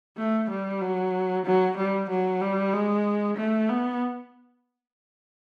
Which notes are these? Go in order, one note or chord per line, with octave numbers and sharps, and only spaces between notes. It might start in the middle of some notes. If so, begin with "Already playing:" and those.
A3
G3
F#3
F#3
G3
F#3
G3
G#3
A3
B3